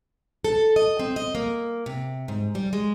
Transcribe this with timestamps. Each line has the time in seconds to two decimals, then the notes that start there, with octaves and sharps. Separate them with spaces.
0.44 A4
0.76 D#5
0.99 C4
1.16 D#5
1.35 A#3
1.86 C3
2.28 G#2
2.55 G3
2.73 G#3